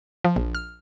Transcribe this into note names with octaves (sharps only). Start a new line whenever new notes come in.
F3
A#1
F6